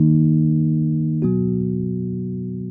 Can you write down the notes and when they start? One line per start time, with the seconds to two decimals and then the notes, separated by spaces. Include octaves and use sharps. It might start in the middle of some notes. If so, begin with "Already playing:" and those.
Already playing: D#3 A#3 D#4
1.22 B2 F#3 B3 F#4